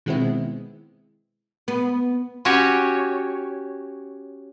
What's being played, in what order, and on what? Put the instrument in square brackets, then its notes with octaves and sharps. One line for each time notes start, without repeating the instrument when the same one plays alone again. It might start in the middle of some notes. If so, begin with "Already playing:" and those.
[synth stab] B2 D#3 G#3 B3 C4 E4
[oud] B3
[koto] C#4 F#4 G4 C#5